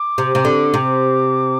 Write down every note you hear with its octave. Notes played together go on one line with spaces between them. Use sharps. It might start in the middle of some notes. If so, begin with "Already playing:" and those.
Already playing: D6
C3
C3
D3
C3